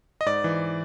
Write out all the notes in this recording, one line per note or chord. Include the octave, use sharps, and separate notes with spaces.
D#5
G#2 D5
E3